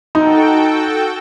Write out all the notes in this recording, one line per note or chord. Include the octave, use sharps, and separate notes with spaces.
D#4 F#4 A4 G5